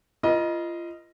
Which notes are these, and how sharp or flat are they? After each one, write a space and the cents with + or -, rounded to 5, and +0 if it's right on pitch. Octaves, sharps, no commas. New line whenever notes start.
F4 -30 A#4 +45 D#5 +0